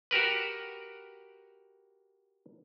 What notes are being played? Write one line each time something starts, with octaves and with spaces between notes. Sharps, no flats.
F#4 G4 A#4 B4